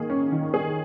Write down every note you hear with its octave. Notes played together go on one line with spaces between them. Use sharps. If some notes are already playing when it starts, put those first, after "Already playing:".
Already playing: D#3 A#3 G#4
C#4
D#3
G#4